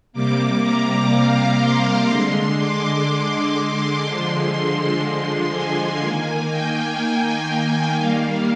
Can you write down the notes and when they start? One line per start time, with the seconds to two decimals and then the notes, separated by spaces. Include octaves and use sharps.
0.13 C3 G3 A#3 D6
0.62 A#5
1.10 F5
1.60 C6
2.08 D3 G#3
2.57 D6
4.04 D3 F3 G#3 C6
5.02 C6
5.50 G#5
5.99 D#3 A#3 G#5
6.49 G5
6.98 G#5
7.46 G5
7.95 D#3 G3 A#3 F5